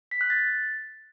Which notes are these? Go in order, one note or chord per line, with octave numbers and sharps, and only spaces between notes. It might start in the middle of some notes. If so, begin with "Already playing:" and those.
B6
F#6
A6